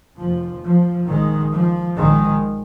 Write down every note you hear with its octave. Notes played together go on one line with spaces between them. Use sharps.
F1 D#2 F3
F3
A#1 G#2 D#3 G#3
F3
A#1 G#2 D#3 G#3